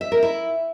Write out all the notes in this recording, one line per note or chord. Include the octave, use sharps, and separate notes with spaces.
E5
A#4
E4